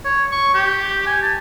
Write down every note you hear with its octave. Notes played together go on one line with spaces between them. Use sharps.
C#5
C#6
G4
G#5
A5